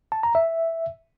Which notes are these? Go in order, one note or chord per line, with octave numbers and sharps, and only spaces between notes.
A5
A#5
E5